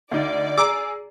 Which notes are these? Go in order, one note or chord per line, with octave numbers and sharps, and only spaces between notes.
D2 D#4 D5
G#4 A#5 D6 E6